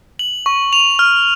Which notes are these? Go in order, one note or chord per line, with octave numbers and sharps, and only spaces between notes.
F#7
C#6
F7
F6